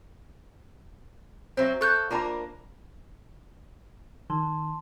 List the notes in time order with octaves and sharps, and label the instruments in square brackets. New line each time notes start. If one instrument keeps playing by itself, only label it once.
[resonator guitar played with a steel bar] F#3 C4 [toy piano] C5 E5
[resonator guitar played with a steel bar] A4 [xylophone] C#6 F#6 G6
[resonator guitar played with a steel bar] A#3 D4 A#4 [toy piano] F4 A5 B5
[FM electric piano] D#3 [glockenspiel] A5 C6